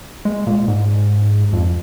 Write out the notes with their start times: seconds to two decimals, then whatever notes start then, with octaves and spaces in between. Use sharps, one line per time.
0.25 G#3
0.47 A#2
0.68 G#2
1.53 F2